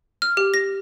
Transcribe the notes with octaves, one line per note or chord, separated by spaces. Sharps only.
F6
G4
A#6